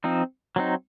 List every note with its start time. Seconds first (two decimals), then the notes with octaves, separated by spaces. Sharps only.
0.04 F3 C4 D#4
0.56 F#3 C4 D#4